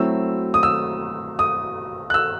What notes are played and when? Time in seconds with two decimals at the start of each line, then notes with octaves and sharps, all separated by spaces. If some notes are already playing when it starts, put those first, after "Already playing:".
Already playing: F#3 A3 C4 E4 E6
0.54 D#6
0.63 E6
1.39 D#6
2.10 F#6
2.14 E6